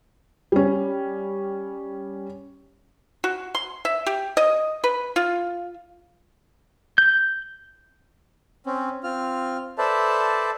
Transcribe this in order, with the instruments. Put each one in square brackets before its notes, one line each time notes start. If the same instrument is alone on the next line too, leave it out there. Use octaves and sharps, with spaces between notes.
[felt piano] G3 C#4
[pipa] F#4
C6
E5
G4
D#5
B4
F4
[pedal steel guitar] G6
[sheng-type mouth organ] C4 C#4
C4 F4 F6
A4 B4 C5 D5 E5 A5